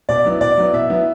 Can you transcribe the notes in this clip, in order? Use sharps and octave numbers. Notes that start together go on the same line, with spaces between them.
B2 D5
F#3 B3 E4
B2 D5
F#3 B3 E4
B2 E5
F#3 B3 E4